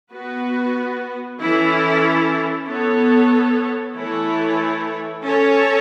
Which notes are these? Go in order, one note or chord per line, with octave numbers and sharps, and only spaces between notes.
B3 F#4 B4
E3 C#4 E4 A4
B3 A4 C#5
E3 A3 E4 A4 C#5
C#4 A4 C#5